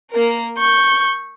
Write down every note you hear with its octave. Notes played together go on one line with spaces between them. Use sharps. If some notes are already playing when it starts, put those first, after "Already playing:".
A#3 A#4
C#6 G6